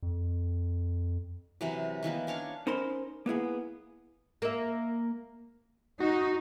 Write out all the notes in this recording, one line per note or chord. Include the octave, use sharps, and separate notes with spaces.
F2
C3 E3 F#3
D#3 E3 A#3 B3
C#4 D4 C#5 F5
C#4 D#4 A#4 C5 B5 C6
A#3 B3 E4 G#4
A#3 E5
D#4 F#4